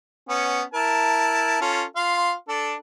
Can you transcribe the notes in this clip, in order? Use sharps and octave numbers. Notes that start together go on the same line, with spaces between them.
B3 C#4
E4 A#4 A5
C#4 F4 A4
F4 F5 C6
D4 A4